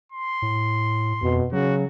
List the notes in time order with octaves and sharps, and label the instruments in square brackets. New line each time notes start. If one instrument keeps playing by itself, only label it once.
[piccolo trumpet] C6
[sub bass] A2
[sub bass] F2 [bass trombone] B2
[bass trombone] C#3 [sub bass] F#3 [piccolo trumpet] F#4